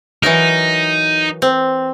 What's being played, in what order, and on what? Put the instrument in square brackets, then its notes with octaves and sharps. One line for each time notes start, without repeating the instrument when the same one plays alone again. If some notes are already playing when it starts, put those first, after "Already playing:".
[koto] E3 F#3 A#4 [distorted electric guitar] D#4
[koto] C4